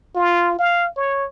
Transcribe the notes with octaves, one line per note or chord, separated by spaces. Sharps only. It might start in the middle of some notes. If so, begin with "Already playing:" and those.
F4
F5
C#5